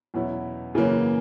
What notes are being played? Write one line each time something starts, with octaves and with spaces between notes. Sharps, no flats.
E2 B2 F#3 C#4 E4
F#2 C#3 E3 A#3 C#4